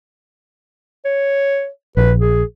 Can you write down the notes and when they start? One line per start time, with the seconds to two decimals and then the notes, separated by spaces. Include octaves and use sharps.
1.05 C#5
1.97 A#1 B4
2.19 G#4